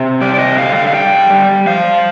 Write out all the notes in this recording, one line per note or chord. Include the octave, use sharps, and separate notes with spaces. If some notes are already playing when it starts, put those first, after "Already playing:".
Already playing: C3
G3 D5
D5
D#5
D3 F5
F5
F5
G3 G5
G3
F3 F5